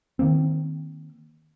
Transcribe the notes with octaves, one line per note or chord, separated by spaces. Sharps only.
D#3 F3 A#3 C4